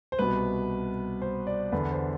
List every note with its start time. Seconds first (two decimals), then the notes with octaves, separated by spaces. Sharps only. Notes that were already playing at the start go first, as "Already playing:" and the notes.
0.12 C5
0.19 C2 B2 B4
1.22 C5
1.47 D5
1.72 E2 D3 B4
1.92 C5